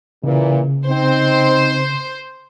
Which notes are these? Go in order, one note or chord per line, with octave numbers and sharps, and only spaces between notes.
A#2 C#3 E3
C4 D#4 C5